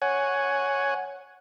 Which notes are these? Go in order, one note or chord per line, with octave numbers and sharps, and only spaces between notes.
C#5 F#5 G#5